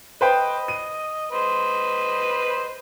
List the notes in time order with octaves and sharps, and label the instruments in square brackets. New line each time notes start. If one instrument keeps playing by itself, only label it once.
[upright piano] B4 C5 G5 [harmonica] D#5
[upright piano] D#7
[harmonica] B4 C5 D#5